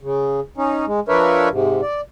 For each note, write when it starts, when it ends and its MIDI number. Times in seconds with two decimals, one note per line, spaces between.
0.01 0.40 49
0.57 0.85 61
0.57 0.85 63
0.87 1.00 56
1.08 1.49 53
1.08 1.49 62
1.08 1.49 70
1.08 1.49 71
1.08 1.49 73
1.08 1.49 76
1.51 1.81 44
1.51 1.81 48
1.82 2.01 74